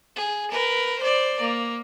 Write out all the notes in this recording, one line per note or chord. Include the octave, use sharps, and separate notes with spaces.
G#4
A#4 B4
C5 D5
A#3